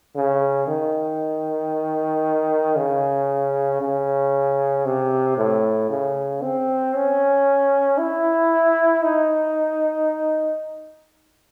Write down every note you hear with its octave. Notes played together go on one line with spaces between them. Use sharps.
C#3
D#3
C#3
C#3
C3
A2
C#3
C4
C#4
E4
D#4